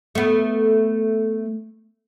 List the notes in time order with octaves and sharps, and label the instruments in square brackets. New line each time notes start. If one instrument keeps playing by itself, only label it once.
[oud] A3 B3